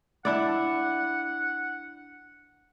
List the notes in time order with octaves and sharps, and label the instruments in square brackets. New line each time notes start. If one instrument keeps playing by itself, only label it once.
[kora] D4 E4 D5 [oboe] F#5